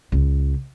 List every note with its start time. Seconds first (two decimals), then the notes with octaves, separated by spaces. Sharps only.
0.12 C#2